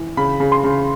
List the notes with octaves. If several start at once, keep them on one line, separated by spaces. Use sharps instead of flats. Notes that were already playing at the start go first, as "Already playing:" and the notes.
Already playing: E3
C#3 B5
C#3
C6
C#3